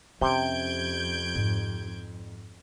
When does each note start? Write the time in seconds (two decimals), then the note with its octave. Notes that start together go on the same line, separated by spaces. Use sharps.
0.21 F2 C3 C#4 G6 G#6 D7
1.35 G#2